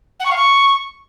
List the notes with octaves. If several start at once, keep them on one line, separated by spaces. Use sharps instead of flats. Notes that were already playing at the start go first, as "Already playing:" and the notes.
F#5
C#6
F5
C#6